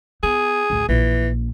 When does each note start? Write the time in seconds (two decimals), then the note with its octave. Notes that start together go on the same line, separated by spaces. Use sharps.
0.23 B3 G#4
0.70 A1 D2
0.89 A#1 E3